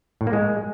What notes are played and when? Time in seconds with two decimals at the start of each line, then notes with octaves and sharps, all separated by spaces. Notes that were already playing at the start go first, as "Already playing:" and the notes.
0.21 A2
0.27 A#3
0.33 G#3